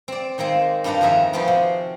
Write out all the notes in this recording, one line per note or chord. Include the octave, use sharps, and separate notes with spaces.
C4 D5
D#3 G#3 A#3 C4
G2 G3 F4 G4 F#5 A#5
F2 D#3 G#4 A#4 E5 A#5
F3 B3 C4 F4 F#4
C3